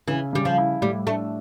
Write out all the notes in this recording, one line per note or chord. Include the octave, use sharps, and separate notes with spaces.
C#3 E3
C#3 G3
F3
E4
A2 G3
A3 D4